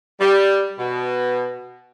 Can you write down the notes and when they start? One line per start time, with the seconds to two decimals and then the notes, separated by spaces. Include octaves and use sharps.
0.20 G3
0.78 B2